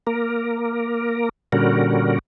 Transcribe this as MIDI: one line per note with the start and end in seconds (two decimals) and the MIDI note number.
0.07 1.29 58
0.07 1.29 70
1.53 2.19 46
1.53 2.19 50
1.53 2.19 55
1.53 2.19 61
1.53 2.19 66
1.53 2.19 70